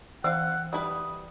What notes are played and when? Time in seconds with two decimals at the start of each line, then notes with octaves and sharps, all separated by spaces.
0.24 E3 C4 F5 F#5
0.73 G3 E4 B4 D#6